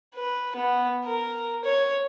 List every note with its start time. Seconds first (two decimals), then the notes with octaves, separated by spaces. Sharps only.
0.14 B4
0.56 B3
1.05 A#4
1.65 C#5